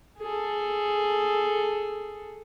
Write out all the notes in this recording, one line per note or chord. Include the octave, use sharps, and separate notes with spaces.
G#4 A4